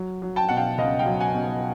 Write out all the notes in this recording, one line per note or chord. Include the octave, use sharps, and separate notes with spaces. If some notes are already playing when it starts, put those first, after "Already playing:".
Already playing: F#3
F#3
G5 A5
B2 F#5
F5 G5
C#2 D#5 F5
F5 G5
F#3
F#5 G#5
B2